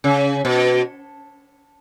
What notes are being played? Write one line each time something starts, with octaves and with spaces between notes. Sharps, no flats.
C#3
B2